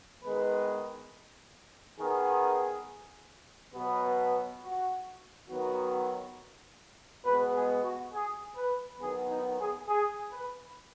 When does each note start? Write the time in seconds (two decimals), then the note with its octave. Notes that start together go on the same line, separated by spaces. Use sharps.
0.24 D#3 G#3 B3 B4
1.99 D#3 B3 G#4
3.74 B2 F#3 B3
4.62 F#4
5.49 D#3 F#3 B3 F#4
7.24 B2 G#3 B3 B4
7.55 G#4
7.83 F#4
8.12 G#4
8.56 B4
9.00 D#3 F#3 B3 G#4
9.29 D#4
9.59 G#4
9.88 G#4
10.32 B4